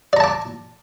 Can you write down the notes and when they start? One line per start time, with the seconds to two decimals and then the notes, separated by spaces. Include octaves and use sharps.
0.13 D5
0.17 A#5
0.20 A5
0.24 D6